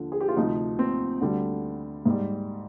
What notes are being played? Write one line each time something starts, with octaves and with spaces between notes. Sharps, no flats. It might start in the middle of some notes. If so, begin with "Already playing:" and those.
Already playing: D#2 D3 F3
G#4
G4
F4
D2 C3 F3 D#4
C4
D2 D3 G3
G#2 G3